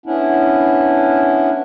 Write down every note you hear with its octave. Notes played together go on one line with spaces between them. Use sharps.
B3 C#4 D4 E4